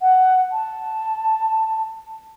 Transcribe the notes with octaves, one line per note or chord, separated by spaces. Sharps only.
F#5
A5